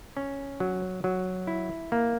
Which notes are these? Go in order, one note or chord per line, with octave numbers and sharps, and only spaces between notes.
C#4
F#3
F#3
E4
A#3